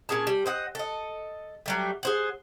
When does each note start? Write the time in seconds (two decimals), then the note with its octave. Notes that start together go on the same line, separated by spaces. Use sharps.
0.09 A#2 C#4 G#4 A5
0.27 G3
0.46 C5 D#5 F#5
0.75 A4 D#5
1.66 F#3 G3 A3
2.03 G#4 C5 F#5